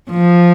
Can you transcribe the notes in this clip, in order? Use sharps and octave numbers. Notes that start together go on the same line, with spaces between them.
F3